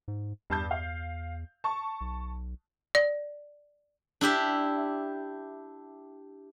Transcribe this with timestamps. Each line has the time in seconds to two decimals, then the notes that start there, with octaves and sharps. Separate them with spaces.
0.08 G#2
0.50 E2 G2 A5 G6
0.71 F5
1.64 A5 C#6
2.01 B1
2.95 D5
4.21 D4 E4 G4 E5